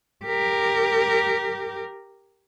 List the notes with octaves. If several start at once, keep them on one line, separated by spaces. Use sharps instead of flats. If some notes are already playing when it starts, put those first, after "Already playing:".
G4 A#4